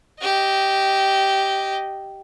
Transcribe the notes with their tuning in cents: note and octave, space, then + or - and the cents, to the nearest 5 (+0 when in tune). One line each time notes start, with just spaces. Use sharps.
G4 -10 D#5 +0